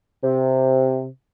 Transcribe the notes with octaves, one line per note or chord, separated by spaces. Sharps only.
C3